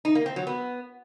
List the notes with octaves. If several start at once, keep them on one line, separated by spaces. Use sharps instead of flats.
D#4
A#3
C4
F#3
B3